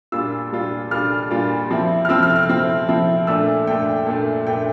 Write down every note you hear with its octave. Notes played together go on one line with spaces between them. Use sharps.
A#2 G3 D4 F4 E6
A#2 G3 D4 F4
A#2 G3 D4 F4 F6
A#2 G3 D4 F4
F3 C4 E4
F6
F3 C4 E4 E6
F6
F6
F3 C4 E4
F3 C4 E4
A#2 A3 D4 E6
A#2 A3 D4 G5
A#2 A3 D4
A#2 A3 D4 G5